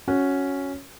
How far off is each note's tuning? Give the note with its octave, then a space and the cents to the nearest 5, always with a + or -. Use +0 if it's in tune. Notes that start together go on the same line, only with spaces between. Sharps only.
C#4 +0 F#4 -5